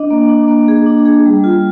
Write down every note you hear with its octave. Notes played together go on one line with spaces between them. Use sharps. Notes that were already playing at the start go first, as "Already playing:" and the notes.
Already playing: D4 D#5
A#3
D4
A#3
G#4
D4
G#4
G3
F4